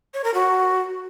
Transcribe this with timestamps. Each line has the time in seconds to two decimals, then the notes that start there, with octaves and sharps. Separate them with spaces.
0.14 C#5
0.24 A#4
0.34 F#4